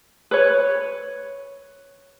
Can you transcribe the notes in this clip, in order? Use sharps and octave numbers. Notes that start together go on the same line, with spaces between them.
B4 C#5